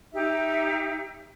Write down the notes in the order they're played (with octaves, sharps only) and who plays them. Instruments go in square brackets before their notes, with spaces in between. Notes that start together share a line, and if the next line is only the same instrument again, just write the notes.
[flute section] D#4 G4 E5